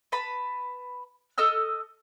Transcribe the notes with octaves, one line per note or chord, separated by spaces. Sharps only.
B4 A5 B5
A4 D#5 E6 F6